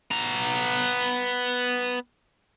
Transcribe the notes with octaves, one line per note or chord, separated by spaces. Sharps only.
B3 A#5